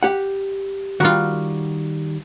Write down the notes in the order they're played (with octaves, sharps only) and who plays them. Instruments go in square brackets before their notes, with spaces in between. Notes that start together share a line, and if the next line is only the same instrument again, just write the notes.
[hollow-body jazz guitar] G4 F#5
[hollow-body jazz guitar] D#3 G3 [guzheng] F4 F#4